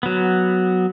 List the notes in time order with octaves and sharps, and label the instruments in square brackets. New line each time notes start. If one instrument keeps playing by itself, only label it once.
[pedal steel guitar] F#3 B3